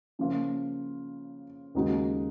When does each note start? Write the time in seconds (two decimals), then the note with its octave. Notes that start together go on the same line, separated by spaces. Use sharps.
0.19 C#3 F3 A#3 F4
1.75 D#2 C#3 G#3 D#4 F#4